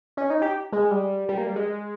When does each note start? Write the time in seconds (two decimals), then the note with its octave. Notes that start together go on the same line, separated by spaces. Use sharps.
0.17 C#4
0.30 D#4
0.42 G4
0.72 G#3
0.91 G3
1.29 G3
1.38 A#3
1.47 G3
1.56 G#3